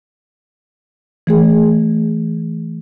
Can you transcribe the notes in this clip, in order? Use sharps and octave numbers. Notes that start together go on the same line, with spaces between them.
E3 A3 G#4